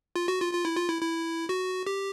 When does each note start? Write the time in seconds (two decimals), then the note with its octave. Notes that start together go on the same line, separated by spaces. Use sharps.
0.16 F4
0.28 F#4
0.41 F4
0.53 F4
0.65 E4
0.77 F4
0.89 E4
1.02 E4
1.49 F#4
1.87 G4